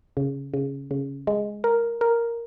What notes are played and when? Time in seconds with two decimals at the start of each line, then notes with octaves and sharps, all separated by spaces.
0.17 C#3
0.54 C#3
0.91 C#3
1.27 G#3
1.64 A#4
2.01 A#4